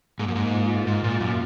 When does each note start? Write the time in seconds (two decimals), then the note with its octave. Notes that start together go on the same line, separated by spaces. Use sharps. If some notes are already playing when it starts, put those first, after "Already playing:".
0.19 G#2 A#3
0.28 F#2
0.36 G#2
0.53 F4
0.86 G#2 F4
1.04 A#2
1.20 F#2 A#3